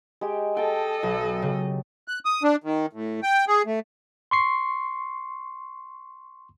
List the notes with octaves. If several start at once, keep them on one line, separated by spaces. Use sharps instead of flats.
G#3 G4 G5
A4 D#5 G5 A5
B1
C#3
F#6
D#6
D4
D#3
A2
G5
G#4
A3
C6 C#6 C7